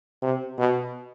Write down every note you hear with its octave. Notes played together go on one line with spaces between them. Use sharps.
C3
B2